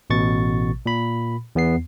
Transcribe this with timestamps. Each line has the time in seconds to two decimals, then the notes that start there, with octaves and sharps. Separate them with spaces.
0.10 A1 B2 C#6 A6
0.86 A#2 B5
1.55 E2 B3 C7